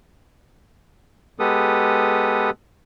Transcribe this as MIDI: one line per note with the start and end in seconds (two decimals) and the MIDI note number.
1.40 2.50 56
1.40 2.50 59
1.40 2.50 67
1.40 2.50 69
1.40 2.50 71
1.40 2.50 87